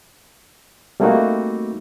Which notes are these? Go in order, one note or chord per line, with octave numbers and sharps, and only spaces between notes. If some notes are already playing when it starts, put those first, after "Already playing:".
G3 A3 A#3 C4 D#4 F#4